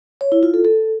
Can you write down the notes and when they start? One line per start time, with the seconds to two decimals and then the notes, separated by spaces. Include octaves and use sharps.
0.21 C#5
0.32 E4
0.43 F4
0.54 A4
0.65 A4